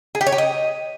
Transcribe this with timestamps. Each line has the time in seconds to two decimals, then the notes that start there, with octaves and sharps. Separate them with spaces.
0.15 G#4
0.21 G4
0.27 C#5
0.32 G4
0.38 D#5